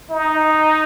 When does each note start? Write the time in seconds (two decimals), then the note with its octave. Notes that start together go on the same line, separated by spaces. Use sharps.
0.11 D#4